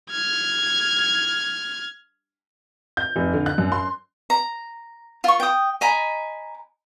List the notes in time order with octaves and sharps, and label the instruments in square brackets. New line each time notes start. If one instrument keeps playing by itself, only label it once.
[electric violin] F6 G#6
[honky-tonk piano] G6
F1
D3
F#6
F#2
C6
[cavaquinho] A#5
F4 C#6
G5 D#6
D#5 G#5 A#5 B5